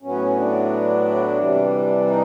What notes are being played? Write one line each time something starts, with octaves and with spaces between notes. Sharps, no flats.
A2 F#3 B3 C#4
D4
C3 E3 G3
D#4